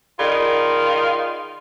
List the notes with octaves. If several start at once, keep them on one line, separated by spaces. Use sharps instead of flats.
D#3 F4 G#4 D5 B5